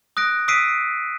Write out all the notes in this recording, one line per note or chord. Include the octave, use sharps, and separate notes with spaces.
D#6 F#6 A#6 D7
D#6 E6 B6 C7 D7 D#7